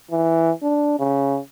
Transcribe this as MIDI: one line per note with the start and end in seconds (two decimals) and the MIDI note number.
0.11 0.51 52
0.63 0.95 62
0.99 1.38 49